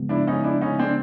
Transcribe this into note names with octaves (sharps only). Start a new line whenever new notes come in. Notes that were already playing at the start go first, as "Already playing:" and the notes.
Already playing: C#3 F3 G#3 B3
D4 E4
C#4 D#4
D4 E4
C#4 D#4
C4 D4